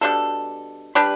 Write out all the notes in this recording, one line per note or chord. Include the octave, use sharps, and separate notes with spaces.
B2 G3 D4 A4
G3 D4 G4 B4